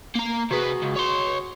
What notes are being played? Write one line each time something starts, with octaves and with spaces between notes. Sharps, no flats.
A#3 A#5
C3 F#4 G#4 B4
C#2
C#5 C6